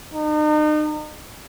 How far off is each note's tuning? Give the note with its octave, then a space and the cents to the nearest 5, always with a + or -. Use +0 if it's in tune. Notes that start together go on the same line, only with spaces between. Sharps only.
D#4 -40